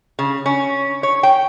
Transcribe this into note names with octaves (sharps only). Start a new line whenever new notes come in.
C#3
C#4
C#5
G5